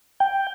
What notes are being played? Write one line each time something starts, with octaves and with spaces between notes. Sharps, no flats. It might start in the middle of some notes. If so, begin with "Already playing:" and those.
G5